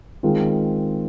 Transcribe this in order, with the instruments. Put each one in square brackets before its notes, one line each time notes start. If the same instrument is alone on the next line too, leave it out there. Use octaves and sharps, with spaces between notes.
[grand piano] D#3 G#3 C4 F4